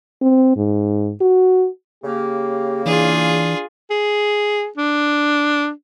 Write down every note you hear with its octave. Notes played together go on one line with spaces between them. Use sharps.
C4
G#2
F#4
C#3 A#3 G4
E3 D4 F4 G#4
G#4
D4